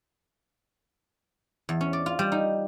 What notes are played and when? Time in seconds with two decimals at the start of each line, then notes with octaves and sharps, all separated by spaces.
1.69 E2
1.81 C#4
1.93 D5
2.06 F4
2.19 G3
2.32 D#4